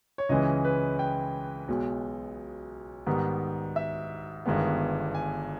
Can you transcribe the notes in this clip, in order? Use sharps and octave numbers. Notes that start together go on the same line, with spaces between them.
C#5
C#2 C#3 E3 G#3 C#4 D#5
B4
G5
B1 B2 G#3
G#2 D#3 G3 B3
E5
G1 G2 D#3 G#3 B3
G#5